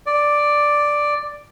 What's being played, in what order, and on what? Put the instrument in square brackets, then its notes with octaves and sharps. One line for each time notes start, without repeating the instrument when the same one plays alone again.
[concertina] D5